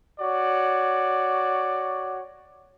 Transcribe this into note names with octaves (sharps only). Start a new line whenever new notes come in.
F#4 C#5 D5